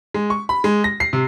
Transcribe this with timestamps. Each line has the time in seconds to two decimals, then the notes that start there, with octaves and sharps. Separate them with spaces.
0.14 G#3
0.30 C#6
0.49 B5
0.64 G#3
0.84 A#6
1.00 C7
1.13 C3